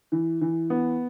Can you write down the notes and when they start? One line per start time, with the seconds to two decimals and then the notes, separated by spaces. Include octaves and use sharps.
0.12 E3
0.41 E3
0.70 B3